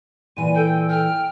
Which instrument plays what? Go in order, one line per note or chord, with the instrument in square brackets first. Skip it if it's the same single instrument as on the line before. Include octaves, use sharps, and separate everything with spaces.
[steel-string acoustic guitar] A#2 E3 G#5 [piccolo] D#7
[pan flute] A4 [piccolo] G5
[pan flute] G5 [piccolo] F6